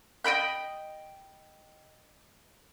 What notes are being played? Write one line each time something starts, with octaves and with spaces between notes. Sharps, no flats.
D#5 G5 B5 G6